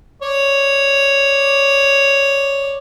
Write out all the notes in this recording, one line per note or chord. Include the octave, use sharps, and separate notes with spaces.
C#5 D5